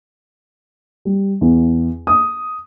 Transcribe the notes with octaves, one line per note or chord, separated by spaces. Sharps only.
G3
E2
D#6